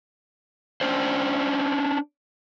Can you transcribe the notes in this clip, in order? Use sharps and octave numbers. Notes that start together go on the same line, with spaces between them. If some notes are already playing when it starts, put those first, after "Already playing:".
C#4 D4 C5